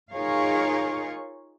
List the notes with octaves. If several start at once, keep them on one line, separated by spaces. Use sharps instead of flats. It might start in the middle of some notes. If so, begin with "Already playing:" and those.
D#4 F4 G#4 A#4 C#5 F5